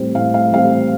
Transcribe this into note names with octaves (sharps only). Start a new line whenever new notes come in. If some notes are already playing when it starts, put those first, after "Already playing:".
Already playing: A2 G3 C4
A2 F5
F5
G3 C4 F5